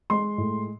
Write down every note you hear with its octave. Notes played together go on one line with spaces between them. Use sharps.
G#3 C6
A2